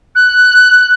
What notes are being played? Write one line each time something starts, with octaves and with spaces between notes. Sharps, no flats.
F#6